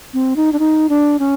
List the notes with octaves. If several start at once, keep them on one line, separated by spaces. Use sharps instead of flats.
C4
D#4
D4
D#4
D4
C#4